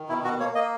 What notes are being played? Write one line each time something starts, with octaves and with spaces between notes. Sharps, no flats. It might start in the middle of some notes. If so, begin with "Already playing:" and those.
Already playing: D#3
B2 E4
B2 F#4
A#3 C#5
A#3 D#5